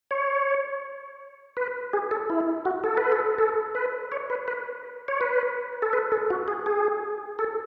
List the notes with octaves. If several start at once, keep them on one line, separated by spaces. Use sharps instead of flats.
C#5
B4
G#4
A4
E4
F#4
A4
B4
A4
A4
B4
C#5
B4
B4
C#5
B4
A4
B4
A4
F#4
G#4
G#4
A4